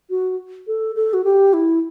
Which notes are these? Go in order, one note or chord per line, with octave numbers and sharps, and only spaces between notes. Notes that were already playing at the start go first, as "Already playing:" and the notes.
F#4
A4
A4
F#4
G4
E4